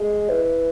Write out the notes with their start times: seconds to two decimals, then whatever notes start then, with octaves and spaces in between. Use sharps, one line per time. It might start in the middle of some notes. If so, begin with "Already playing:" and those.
Already playing: G#3
0.29 E3